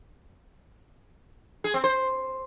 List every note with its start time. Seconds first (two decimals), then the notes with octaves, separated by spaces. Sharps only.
1.64 G#4
1.74 C4
1.84 C5